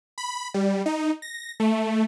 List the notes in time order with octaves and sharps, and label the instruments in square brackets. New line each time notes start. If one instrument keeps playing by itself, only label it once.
[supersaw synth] B5
G3
D#4
A#6
A3